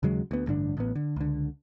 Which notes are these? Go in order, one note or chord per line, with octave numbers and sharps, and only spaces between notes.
D#2 C#3 F#3 G#3
D2 B3
A1 G2 D3 D4
A1 A2 B3
D3
C#2 D3